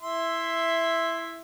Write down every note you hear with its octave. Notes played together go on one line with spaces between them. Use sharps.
E4 E5 C6